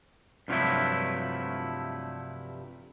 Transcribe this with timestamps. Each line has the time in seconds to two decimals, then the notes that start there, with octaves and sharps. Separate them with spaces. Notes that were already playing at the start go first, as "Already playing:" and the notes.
0.48 G2 C3 F3 F#3 A3 E4